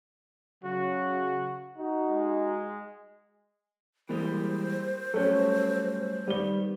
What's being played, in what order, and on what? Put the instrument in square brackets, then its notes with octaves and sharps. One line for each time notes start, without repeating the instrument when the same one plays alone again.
[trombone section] C#3 F#3 [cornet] F#4
[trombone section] D#4 F#4
[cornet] G#3
[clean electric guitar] E3 G3 G#3 [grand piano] A#3 [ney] C5
[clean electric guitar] F#3 G3 A3 [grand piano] C#4 A4
[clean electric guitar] D#3 B3 [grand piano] G3 G7